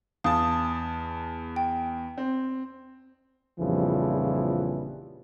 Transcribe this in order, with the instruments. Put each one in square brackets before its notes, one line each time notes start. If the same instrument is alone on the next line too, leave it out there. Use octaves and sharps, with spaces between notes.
[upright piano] E2 A5 [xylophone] F5 D#6
[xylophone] G5
[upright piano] C4
[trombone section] A#1 F2 C#3 E3 F3 G3